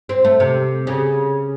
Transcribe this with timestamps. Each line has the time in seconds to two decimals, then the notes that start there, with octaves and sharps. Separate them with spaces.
0.09 C4
0.25 A3
0.40 C3
0.87 C#3